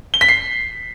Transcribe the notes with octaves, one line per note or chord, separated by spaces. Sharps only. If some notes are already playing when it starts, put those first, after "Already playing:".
G7
B6
C7